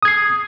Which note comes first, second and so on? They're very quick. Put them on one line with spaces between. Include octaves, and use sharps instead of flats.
D#6 G#6 C7